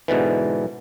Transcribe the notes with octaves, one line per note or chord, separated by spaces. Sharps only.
G#2 B2 D3 E3